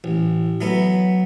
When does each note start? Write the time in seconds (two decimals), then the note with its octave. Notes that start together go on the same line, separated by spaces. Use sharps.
0.04 A1
0.61 F#3 A3 B3